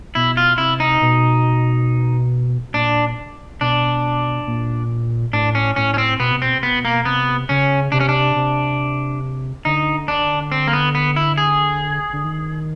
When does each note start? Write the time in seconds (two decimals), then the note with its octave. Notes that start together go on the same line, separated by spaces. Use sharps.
0.15 B2 E4
0.37 F4
0.58 C3 E4
0.80 D#4
1.02 B2
2.74 A#2 D4
3.61 B2 D4
4.47 A#2
5.33 A2 D4
5.55 C#4
5.76 A2 C#4
5.94 C#4
5.98 C4
6.19 B2 B3
6.32 C3
6.42 B2 C4
6.55 C3
6.63 B2 B3
6.85 A#3
7.05 C3 B3
7.49 C#3 C#4
7.92 C3 D4
8.00 C#4
8.09 D4
8.36 C3
9.65 D3 D#4
10.08 D4
10.52 C4
10.67 A#3
10.73 B3
10.95 B3
11.16 E4
11.38 G#4
12.13 D3
12.25 D#3